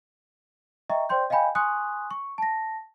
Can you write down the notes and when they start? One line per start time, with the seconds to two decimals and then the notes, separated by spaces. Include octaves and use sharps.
0.90 D#5 E5 G5 A#5 C#6
1.09 C5 D5 G5 C6 G6
1.30 D#5 F5 G5 G#5 B5 G6
1.55 G#5 C6 C#6 D#6 F#6
2.11 C#6
2.38 A5 A#6